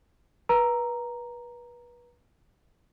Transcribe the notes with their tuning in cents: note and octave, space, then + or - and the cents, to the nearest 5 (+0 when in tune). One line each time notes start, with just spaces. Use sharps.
B4 -30 A#5 +0